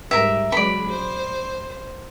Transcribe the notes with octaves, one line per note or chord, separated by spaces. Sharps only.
G#2 G3 A#4 E5
C#3 F#3 G#3 D5 B5
C5